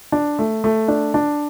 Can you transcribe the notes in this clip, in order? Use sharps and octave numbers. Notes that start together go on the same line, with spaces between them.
D4
A3
A3
D4
D4